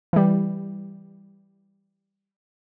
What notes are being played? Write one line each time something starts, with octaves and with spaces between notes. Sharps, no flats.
E3 G3